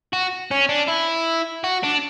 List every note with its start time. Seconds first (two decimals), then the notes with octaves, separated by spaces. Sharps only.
0.13 F#4
0.51 C#4
0.69 D4
0.88 E4
1.64 F#4
1.83 D4